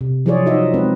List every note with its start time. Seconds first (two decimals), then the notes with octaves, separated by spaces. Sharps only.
0.01 C3
0.26 F3 F#3 F4 G#4 C#5 D5
0.45 F#3 D#4 F#4 D#5 E5
0.73 G#3 C4 B4